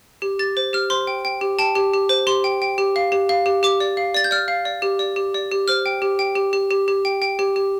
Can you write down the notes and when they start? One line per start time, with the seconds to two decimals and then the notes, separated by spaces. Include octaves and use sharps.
0.22 G4
0.39 G4 A6
0.57 C5
0.73 G4 F6
0.90 C5 C6
1.07 G5
1.25 G5
1.41 G4
1.59 G5 A5
1.75 G4
1.94 G4
2.09 C5
2.27 G4 C6
2.44 G5
2.62 G5
2.78 G4
2.96 F5
3.12 G4
3.29 F5
3.46 G4
3.63 G4 D6
3.80 D5
3.97 F5
4.15 D5 A6
4.24 G6
4.31 D5 F6
4.48 F5
4.65 D5
4.82 G4
4.99 D5
5.16 G4
5.34 D5
5.51 G4
5.68 C5 F6
5.86 G5
6.02 G4
6.19 G5
6.36 G4
6.53 G4
6.70 G4
6.88 G4
7.05 G5
7.22 G5
7.39 G4
7.56 G4